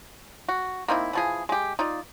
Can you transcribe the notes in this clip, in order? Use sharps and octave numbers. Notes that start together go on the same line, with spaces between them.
F#4
A#3 C4 D#4 E4
E3 F3 G#4
G#3 G4
D#4 F4 D5